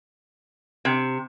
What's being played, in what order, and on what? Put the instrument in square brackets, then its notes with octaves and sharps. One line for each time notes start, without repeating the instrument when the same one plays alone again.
[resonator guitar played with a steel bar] C3